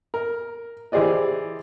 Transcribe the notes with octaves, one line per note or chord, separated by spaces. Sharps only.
A#4
E3 G4 G#4 C5 D5 D#5